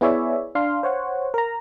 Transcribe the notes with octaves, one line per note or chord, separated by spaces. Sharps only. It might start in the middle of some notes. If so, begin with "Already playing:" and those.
B3 E4 G#4 C#5 D5 E5
D4 F5 C6
C5 C#5 F#5
A#4 A#5